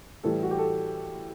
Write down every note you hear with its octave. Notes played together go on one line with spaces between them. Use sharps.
A2 E3 G3 A4
F#4
G4
A4